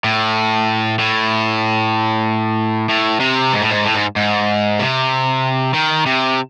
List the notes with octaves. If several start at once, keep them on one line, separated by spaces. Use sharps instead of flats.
A2
A2
A2
C3
G#2
A2
G#2
A2
G#2
G#2
C3
D#3
C3